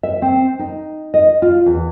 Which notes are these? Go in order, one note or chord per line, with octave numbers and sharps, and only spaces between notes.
E5
C4
D#4
D#5
F4
E2